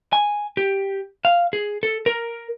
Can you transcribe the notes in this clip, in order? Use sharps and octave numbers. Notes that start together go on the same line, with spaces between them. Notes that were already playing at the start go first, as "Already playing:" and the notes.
G#5
G4
F5
G#4
A4
A#4